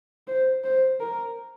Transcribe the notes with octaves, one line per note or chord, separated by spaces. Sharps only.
C5
C5
A#4